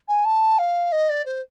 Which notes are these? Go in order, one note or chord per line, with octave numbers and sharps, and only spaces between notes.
G#5
A5
F5
D#5
D5
C5